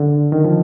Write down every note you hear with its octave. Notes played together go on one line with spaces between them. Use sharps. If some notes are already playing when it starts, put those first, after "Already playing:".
Already playing: D3
D#3
F3